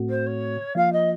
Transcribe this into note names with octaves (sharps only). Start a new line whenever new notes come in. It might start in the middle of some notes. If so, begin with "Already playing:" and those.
Already playing: A2 A3 C4 F#4
C5
C#5
F3 A#3 F4 F5
D#5